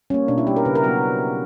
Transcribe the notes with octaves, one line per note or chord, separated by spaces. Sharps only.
G3 A#3 C#4
B2 D4
E4
G3 A#3 G4
A#4
C#3 B4
A#4
F#3 B3 F#4